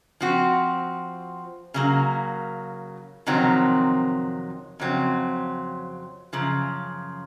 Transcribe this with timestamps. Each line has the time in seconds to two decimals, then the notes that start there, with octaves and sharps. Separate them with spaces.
0.21 F3 C4 F#4
1.74 C#3 F#3 A#3
3.27 F2 C3 D#3 F#3 C4
4.80 F2 C#3 F#3 C4
6.33 F#2 C#3 F3